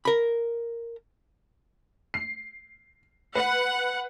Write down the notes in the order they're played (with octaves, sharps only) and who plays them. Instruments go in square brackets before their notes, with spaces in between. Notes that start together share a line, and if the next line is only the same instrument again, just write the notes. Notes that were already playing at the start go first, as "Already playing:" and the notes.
[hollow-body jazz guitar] A#4 B5
[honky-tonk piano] C7
[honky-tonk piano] B4 [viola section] F#5